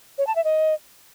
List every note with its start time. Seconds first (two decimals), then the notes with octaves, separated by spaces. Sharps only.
0.18 C#5
0.27 A5
0.36 E5
0.44 D#5